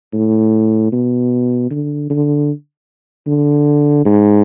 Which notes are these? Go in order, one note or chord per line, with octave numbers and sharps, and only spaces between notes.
A2
B2
D3
D3
D3
G#2